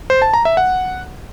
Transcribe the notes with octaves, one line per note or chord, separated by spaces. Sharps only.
C5
A5
A#5
E5
F#5